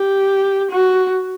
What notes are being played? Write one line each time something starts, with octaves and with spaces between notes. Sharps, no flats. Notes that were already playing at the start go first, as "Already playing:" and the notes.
Already playing: G4
F#4